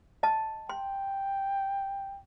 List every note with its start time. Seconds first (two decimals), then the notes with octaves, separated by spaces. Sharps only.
0.23 D#5 A5
0.69 G5 C6